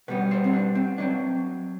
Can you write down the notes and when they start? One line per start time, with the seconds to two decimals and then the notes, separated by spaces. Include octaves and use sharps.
0.08 B2 G3 B3 B4
0.31 C5
0.44 C4
0.53 D4
0.75 C4
0.98 F#3 C4 D4